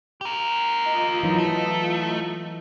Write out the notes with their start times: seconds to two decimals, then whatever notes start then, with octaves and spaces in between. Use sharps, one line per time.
0.21 G4 A#4
0.85 F4 D#5 A#5
1.23 E3 F#3 D#4
1.38 A3